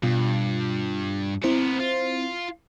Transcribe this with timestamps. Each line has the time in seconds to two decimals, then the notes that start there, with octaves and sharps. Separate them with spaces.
0.03 G2 B2 F4
1.44 B3 C4 E4 A#4 C5
1.80 F4